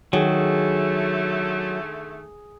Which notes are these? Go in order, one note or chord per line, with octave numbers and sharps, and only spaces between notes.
D3 D#3 F#3 A3 G#4